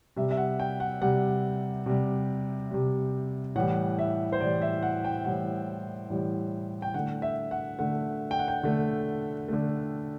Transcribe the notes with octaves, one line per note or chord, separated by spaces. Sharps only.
C3 G3 E5
E5
F#5
G5
F#5
C3 G3 F#5
C3 G3
C3 G3
A2 E3 G3 F#5
E5
C5
A2 E3 G3 D5
E5
F#5
G5
A2 E3 G3 F#5
A2 E3 G3
G5
D3 A3 F#5
E5
F#5
D3 A3 F#5
G5
F#5
G5
D3 A3
D3 A3